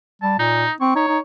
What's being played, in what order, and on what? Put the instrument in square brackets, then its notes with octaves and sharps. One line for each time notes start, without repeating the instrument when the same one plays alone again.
[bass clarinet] G3 [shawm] A5
[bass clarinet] A#2 [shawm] D#4
[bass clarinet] C4 [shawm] C#6
[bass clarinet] D#4 [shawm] C#5
[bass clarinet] D#4